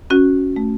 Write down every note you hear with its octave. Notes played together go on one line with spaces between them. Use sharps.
C#4 F#4
A3